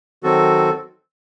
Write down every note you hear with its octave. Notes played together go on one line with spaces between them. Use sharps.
D#3 F#3 C4 F#4 A4